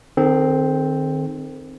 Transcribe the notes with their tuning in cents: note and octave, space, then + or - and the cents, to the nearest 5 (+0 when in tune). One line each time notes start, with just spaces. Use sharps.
D#3 -25 C4 +0 G#4 +45